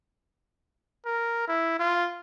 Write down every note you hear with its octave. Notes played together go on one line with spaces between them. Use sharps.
A#4
E4
F4